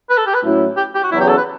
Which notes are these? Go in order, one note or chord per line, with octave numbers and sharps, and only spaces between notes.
B4
A4
G4
B4
A2 F#3 C#4 E4
G4
G4
F#4
E2 C#3 F#3 E4
G4
A4
B4